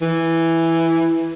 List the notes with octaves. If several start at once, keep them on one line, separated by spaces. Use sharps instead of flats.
E3